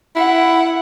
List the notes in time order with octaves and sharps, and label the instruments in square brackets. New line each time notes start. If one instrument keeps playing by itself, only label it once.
[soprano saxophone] E4 [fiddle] F#5